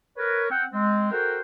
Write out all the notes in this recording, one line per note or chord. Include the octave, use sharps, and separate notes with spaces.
A#4 B4 C#5
C4 F#5 G5
G#3 C4
F#4 A4 A#4 C5 F#5 G5